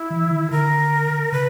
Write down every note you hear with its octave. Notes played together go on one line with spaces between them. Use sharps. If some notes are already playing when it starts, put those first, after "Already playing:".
Already playing: E4
E3
D#3
D3 A#4
C#3 B4